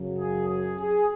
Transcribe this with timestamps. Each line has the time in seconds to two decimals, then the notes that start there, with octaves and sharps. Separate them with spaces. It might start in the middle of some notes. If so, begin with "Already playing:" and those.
Already playing: F#2 C#3 F#3
0.18 G#4
0.48 G#4
0.79 G#4